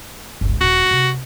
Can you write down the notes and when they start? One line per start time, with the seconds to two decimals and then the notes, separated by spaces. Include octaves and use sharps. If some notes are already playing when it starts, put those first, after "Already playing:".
0.41 G1 C#2
0.61 D#1 F4 F#4
0.91 C3